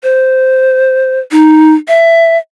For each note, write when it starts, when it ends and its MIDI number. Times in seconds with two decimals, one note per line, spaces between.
0.03 1.20 72
1.32 1.73 63
1.88 2.37 76